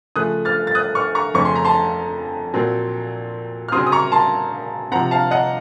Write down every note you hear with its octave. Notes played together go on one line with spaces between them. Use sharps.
C#3 F3 A3 D#6 F#6
F6 A6
A6
D#6 F#6
C#6 F6
A#5 C#6
F2 C#3 A3 C#4 C#6
C6
A#5
A5 C6
A#2 F#3 C4
F6
C#3 F#3 C4 C6 D#6
D#6
A#5 C#6
A5 C6
C3 F3 C4 F#5 A#5
F5 A5
D#5 F#5